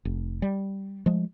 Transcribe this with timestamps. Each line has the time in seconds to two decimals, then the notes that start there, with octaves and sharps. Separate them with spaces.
0.05 F1
0.42 G3
1.06 F3 G#3 A3